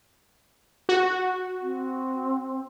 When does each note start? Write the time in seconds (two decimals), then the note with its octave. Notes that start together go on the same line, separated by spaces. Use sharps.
0.89 F#4
1.62 C4